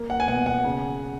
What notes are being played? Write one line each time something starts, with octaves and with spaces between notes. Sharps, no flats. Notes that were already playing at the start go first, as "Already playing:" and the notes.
Already playing: A#3
F#5
G#5
B2 F#5
F#5
C#3